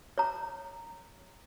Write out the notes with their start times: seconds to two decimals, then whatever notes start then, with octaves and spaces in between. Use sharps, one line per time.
0.18 C#5 A#5